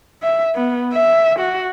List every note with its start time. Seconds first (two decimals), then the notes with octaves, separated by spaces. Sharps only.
0.23 E5
0.55 B3
0.93 E5
1.39 F#4